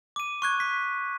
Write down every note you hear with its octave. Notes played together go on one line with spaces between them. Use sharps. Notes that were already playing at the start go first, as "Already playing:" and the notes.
D6 D#7
C#6 F#6 G#6
B6